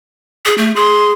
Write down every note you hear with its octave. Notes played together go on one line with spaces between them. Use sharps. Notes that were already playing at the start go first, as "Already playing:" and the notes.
G#4
A3
G#4 C6